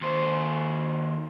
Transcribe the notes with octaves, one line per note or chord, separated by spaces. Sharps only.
D#2 C5